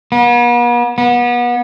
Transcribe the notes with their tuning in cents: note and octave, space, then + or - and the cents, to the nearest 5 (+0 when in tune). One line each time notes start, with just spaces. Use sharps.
B3 -45
B3 -30